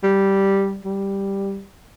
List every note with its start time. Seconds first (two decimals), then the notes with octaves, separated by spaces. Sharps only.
0.03 G3
0.85 G3